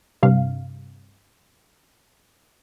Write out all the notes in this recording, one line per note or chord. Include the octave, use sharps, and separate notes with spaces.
G2 C3 F5